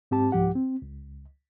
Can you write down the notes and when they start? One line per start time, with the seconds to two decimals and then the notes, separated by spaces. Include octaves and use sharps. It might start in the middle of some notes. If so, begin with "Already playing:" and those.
0.11 G#2 C4 G4 A5
0.32 C2 G#2 F3 G4 F#5
0.55 C4
0.82 C#2